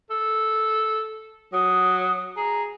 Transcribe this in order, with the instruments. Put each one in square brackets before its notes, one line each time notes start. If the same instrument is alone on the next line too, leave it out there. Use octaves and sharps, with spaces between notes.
[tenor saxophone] A4
[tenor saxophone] F#3 [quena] D#6
[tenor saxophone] G#4 [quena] A#5